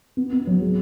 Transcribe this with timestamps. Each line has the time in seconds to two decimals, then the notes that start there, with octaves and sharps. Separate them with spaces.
0.17 B3
0.32 B3
0.47 F#3
0.61 G#3